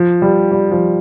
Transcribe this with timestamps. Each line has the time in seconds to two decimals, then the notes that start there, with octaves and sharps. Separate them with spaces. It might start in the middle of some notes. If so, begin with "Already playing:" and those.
Already playing: F3
0.22 G3
0.52 G3
0.71 F3